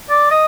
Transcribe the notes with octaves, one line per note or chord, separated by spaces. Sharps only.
D5
D#5